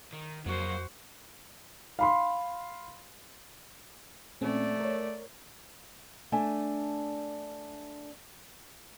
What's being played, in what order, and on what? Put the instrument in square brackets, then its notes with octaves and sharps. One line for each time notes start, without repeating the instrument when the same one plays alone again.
[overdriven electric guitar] D#3
[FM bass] F2 [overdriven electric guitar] F#3 A#3 [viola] F#4 C5
[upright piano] F5 B5 C6
[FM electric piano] A#2 C4 C#4 [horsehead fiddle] A3 D5
[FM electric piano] A#4 C#5
[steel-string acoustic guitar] A3 D4 G#5